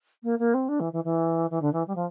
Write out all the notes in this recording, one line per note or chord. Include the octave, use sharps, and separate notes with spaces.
A#3
A#3
C4
D4
E3
E3
E3
E3
D3
E3
G3
F3